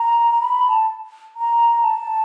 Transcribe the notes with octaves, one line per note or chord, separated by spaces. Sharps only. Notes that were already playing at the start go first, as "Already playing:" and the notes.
Already playing: A#5
A#5
B5
A5
A#5
A5